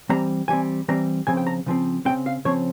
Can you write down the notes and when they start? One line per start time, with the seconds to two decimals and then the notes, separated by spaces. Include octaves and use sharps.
0.09 E3 G3 C4 A#5
0.48 E3 G3 C4 G#5
0.88 E3 G3 C4 A#5
1.27 C#3 F3 C4 G#5
1.37 G5
1.47 A#5
1.66 C#3 F3 C4
2.05 C#3 F3 C4 G5
2.26 F5
2.45 C#3 F3 C4 C#5